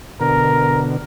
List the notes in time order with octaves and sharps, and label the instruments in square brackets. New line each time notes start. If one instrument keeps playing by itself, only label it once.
[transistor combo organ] B2 D3 [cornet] A#4